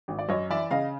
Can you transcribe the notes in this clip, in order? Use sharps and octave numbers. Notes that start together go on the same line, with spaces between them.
G#1
D5
F#2 C#5 D#5
E3 D5 E5
C#3 D#5 F5